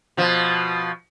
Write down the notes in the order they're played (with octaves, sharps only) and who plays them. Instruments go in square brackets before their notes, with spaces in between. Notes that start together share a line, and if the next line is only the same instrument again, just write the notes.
[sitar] B2 F3